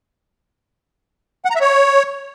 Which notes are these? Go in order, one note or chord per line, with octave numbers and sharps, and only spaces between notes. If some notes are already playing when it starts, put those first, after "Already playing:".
F#5
A#5
E5
C#5